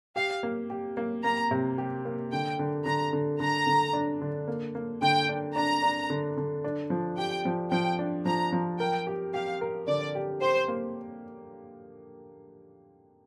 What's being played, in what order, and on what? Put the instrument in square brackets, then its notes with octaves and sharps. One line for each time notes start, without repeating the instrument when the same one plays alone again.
[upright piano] G4 [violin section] F5
[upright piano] A#3
G4
A#3
[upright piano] A#3 [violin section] A#5
[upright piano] C3
G4
A#3
[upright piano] D3 [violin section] G5
[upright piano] D3
[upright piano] D3 [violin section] A#5
[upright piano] D3
[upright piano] D3 [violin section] A#5
[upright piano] D3
D4
D3
A#3
A#3
[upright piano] D3 [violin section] G5
[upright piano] D4
[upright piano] D4 [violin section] A#5
[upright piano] D4
D3
D3
D4
F3
[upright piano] G4 [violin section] G5
[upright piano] F3
[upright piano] F3 [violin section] G5
[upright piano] D4
[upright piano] F3 [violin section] A#5
[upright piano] F3
[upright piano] A#4 [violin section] G5
[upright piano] G4
[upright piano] G4 [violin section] F5
[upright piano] A#4
[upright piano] D3 [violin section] D5
[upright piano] G4
[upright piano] G4 [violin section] C5
[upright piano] A#3